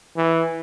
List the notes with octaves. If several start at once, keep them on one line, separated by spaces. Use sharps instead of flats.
E3